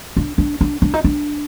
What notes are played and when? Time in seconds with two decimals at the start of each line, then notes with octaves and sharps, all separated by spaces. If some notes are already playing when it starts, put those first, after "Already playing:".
0.17 D4
0.38 D4
0.61 D4
0.82 D4
0.94 D#4
1.04 D4